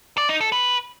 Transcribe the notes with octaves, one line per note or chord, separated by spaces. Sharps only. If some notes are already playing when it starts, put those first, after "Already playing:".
D5
D#4
A4
B4